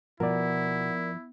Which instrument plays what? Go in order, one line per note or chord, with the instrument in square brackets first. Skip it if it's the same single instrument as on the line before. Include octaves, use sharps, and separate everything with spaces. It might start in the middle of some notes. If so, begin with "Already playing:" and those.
[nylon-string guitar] B2 [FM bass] F3 [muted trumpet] E4 [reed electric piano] A#4 D5